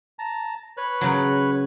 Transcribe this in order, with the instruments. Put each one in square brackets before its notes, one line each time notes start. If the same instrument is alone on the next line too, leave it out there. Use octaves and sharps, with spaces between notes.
[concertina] A5 A#5
B4 C#5 F#6
[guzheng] C#3 F#3